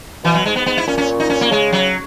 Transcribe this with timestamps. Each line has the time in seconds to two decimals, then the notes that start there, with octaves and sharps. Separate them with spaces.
0.24 B2 E3
0.34 F#3
0.45 G#2 G#3
0.56 B3
0.66 G#2 B3
0.77 E4
0.87 A#2 C#4
0.98 C#4
1.20 D#4
1.30 C#4
1.41 A#3
1.50 C#3 G#3
1.72 F#3